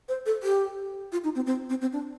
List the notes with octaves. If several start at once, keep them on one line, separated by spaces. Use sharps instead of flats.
C5
A4
G4
F4
D#4
C4
C4
C4
C4
D4